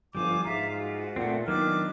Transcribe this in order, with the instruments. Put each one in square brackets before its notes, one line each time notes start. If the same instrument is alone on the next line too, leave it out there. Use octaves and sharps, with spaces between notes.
[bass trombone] G1 [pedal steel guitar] F3 G3 [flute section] F5 G#5 D6
[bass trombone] G#2 [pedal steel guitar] F4 [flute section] E5 F5 A#5
[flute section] F#4
[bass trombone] A#2 [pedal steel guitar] A3 C4 [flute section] F#5
[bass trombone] D#3 [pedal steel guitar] F#3 B3 D4 [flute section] D6 F6